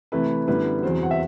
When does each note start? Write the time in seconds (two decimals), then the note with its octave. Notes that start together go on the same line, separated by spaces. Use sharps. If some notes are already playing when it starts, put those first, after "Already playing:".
0.12 C3 E3 A3 E4 B4
0.47 F#2 D3 G3 B3 E4 B4
0.82 E2 C3 F#3 C5
1.03 F#5
1.11 E5